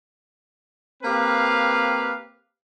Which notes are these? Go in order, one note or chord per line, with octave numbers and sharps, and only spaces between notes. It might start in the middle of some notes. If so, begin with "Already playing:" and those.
A#3 C4 G4 B4 F5